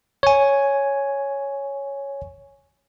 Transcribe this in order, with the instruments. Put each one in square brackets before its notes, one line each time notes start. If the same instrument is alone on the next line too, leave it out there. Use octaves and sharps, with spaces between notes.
[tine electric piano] C#5 G#5